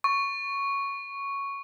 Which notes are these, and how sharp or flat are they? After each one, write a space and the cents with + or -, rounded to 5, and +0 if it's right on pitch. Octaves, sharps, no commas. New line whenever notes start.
C#6 +0